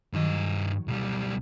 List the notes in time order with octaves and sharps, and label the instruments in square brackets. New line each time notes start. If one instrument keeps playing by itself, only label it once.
[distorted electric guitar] G2 D#5 [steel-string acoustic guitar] D#3 F#3
[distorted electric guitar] B1 G3